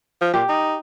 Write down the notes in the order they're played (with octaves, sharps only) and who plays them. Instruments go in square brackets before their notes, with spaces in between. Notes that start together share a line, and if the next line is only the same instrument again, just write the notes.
[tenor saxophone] F3
[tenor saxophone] A#2 [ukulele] G4
[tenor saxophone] D#4